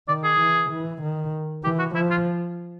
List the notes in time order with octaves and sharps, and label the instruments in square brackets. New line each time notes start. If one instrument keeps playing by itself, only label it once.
[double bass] D#3 [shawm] D5
[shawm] G#4
[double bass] E3
E3
D#3
[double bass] E3 [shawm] G4
[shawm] F#4
[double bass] F3 [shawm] E4
[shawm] F4